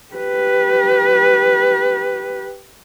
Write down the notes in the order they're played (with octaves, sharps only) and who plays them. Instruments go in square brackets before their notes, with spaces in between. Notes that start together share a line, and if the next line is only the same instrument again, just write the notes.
[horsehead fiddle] G4 B4